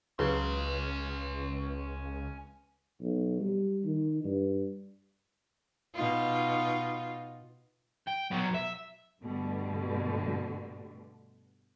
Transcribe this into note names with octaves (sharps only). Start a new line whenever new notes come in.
C#2 C#3 F#3 C#4 B4 C6
B1
G3
D#3
G2
B2 D#4 F4
G5
F#3 B3
E5
G2 B2 D3 G3 A3